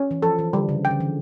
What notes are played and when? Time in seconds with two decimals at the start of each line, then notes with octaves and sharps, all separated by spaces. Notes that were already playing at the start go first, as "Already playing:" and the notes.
Already playing: C#4
0.11 E3
0.23 F3 A4
0.39 E3
0.53 D3 G3
0.69 C#3
0.85 G5
0.91 D3
1.00 E3